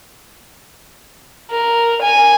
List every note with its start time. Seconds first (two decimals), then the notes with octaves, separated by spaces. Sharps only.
1.51 A#4
2.02 G#5